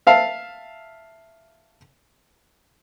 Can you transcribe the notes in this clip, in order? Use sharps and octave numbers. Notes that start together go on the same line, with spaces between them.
E5 F5 A5